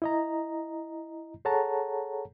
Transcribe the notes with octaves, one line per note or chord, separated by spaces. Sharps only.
E4 D#5 A#5
G#4 A4 C#5 F#5 A5 A#5